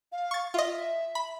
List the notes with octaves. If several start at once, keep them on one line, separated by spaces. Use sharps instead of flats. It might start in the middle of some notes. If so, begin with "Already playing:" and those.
F5
C#6 A6
F4 D#5 E5
B5